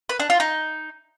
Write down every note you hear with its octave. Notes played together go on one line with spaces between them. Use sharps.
B4
D4
F4
D#4